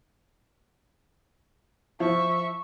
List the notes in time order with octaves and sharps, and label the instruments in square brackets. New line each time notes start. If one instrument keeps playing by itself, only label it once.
[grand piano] F3 [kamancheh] E5 C#6